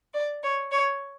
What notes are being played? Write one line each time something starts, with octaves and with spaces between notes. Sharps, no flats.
D5
C#5
C#5